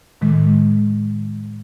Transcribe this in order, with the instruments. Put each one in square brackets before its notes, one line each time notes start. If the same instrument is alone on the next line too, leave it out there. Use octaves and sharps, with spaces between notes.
[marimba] A2 D#3 G#3